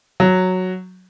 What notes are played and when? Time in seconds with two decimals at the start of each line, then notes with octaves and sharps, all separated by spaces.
0.20 F#3